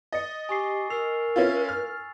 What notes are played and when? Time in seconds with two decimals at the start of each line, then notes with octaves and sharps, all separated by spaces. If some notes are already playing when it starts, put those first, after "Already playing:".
0.13 D#5 A6 C#7
0.49 G4 G#5 C#6 C7
0.90 A#4 E6 C7 F7
1.36 C#4 E4 F4 A6
1.69 F6